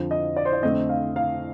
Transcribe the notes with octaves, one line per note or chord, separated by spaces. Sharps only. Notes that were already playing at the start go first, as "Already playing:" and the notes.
Already playing: F2 D3 F3
D#5
D5
C5
D5
F2 D3 A3 C4 D#5
F5
F5